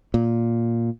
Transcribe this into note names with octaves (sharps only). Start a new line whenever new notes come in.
A#2